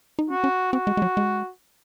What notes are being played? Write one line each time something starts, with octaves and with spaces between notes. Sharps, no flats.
D#4
C#4 F#4
C#4
C4 F#4
G#3
G#3
F#3
G#3